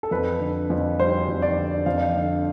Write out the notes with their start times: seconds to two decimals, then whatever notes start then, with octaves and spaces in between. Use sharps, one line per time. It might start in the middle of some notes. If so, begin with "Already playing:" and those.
0.03 A4
0.11 F2 B4
0.40 D3
0.70 F2
0.99 G3 C5
1.28 F2
1.42 D5
1.57 D3
1.86 F2 F5
2.16 D3